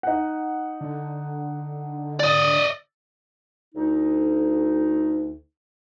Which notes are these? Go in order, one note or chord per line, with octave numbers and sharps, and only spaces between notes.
D#4 F#5
D3
D5 D#5 A6
D2 D#4